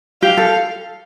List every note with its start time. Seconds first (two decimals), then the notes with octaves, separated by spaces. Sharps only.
0.22 G4 F5
0.37 A4